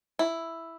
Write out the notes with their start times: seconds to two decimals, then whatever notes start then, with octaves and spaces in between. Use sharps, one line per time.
0.19 E4